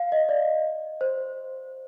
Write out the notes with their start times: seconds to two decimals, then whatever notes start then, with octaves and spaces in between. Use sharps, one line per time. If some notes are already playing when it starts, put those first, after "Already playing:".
Already playing: F5
0.12 D#5
0.29 D5
1.01 C5